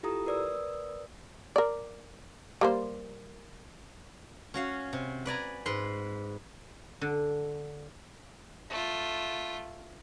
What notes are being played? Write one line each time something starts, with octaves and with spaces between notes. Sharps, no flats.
E4 F4 G4 A4 A#5 D#6
A#4 B4 D5 D#6 E6
A#4 D5
G3 A#3 C5
C#4 F#4 F5
C3
B4 D5 G#5 A#5
G#2 B4 C6
D3
A3 F4